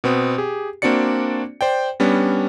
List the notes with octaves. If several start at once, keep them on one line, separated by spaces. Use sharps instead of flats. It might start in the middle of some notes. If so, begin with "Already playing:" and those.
B2 B3 C4
G4 G#4
A#3 C4 D4 F#4 D5 C#7
C5 D5 G5
G3 B3 C#4 D4